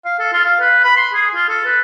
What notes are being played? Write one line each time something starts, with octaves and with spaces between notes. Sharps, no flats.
F5
A4
F4
F5
B4
B5
C6
G#4
F4
A4
B4